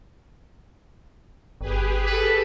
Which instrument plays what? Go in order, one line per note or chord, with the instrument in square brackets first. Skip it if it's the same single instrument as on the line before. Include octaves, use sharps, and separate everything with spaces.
[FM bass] G1 [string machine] G4 G#4 B4
[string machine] A4 [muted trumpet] B4